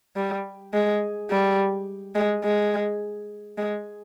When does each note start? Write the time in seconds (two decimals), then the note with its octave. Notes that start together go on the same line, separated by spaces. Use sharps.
0.16 G3
0.73 G#3
1.30 G3
2.15 G#3
2.44 G#3
3.58 G#3